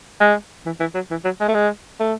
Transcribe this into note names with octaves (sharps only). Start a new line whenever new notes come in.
G#3
E3
E3
F#3
E3
F#3
G#3
A3
G#3
A3